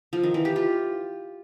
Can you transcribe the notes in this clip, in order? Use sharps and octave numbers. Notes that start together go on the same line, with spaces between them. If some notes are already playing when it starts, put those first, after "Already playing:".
F3
D#3
E3
G4
F4